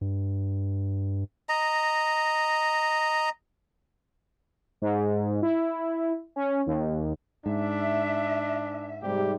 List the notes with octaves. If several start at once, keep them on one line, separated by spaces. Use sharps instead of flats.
G2
D#5 A#5
G#2
E4
C#4
D#2
G#2 D4 E5
G#2 C3 G3 G4